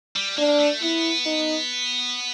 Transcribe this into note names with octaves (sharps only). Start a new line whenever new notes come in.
G3
A#3 D4
A3
B3 E4
D#4